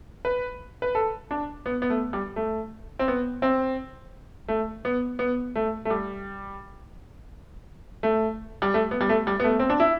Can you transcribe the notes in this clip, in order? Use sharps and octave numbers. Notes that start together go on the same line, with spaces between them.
B4
B4
A4
D4
B3
B3
A3
G3
A3
C4
B3
C4
A3
B3
B3
A3
A3
G3
A3
G3
A3
B3
G3
A3
G3
B3
A3
C4
D4
E4